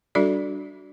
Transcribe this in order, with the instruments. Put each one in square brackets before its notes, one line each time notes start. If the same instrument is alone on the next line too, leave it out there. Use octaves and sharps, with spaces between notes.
[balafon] G3 D4 F#4 A4 D5